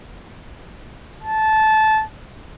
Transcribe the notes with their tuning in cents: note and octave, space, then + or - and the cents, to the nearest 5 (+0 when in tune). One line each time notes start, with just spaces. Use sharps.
A5 -15